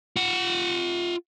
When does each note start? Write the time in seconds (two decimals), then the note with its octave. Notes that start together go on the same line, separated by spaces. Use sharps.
0.16 F4 F#5